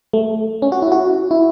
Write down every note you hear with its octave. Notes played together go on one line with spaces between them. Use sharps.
A3
C#4
F#4
E4
F#4
E4